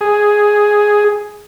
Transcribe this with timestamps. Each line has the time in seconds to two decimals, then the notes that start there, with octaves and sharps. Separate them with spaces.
0.01 G#4